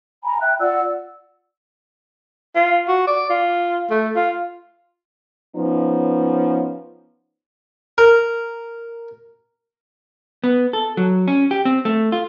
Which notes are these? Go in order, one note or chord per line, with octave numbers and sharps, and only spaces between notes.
G#5 A#5 B5
E5 G5 F#6
F4 D5 F#5 E6
F4
F#4
D5
F4
A3
F4
F3 B3 C#4 D#4
A#4
B3
A4
F#3
C#4
G4
C4
A3
F4